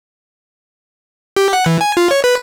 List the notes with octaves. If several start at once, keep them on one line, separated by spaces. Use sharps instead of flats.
G4
F#5
E3
G#5
F4
C#5
B4